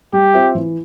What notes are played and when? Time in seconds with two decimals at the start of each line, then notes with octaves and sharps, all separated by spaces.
0.13 G3 G4
0.34 C4 F4 C5 E5
0.55 E3